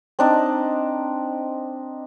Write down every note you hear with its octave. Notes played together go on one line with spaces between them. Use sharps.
C4 D4 D#4